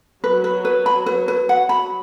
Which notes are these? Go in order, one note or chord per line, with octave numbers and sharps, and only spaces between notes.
F#3 B4
B4
B4
B5
F#3 B4
B4
F#3 F#5
B5